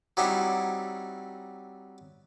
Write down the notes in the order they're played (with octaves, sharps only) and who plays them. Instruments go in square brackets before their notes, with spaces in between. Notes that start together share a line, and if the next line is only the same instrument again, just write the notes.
[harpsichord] F#3 G3 C4 D#4 E4 G4